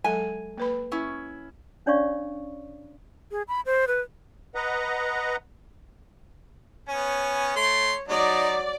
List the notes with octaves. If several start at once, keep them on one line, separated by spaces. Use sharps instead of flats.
F#3 G#3 A4 G#5
A#3 B4 B5
C#4 E4
C#4 D4 C#5 D5 F5 C#6
G#4
B5
C5
B4
B4 D#5 F#5 A#5
B3 C#4 C#5
A3 C6
F#3 D#4 D5